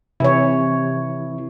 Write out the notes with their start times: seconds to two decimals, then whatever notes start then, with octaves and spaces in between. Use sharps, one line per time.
0.20 C3 E3 E4 C#5